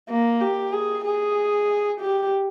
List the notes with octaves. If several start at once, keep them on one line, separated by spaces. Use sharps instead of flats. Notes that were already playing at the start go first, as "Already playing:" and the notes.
A#3
G4
G#4
G#4
G4